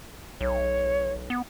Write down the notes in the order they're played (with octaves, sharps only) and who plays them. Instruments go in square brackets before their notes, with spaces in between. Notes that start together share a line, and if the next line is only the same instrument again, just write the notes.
[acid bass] B1 [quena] C#5
[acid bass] B3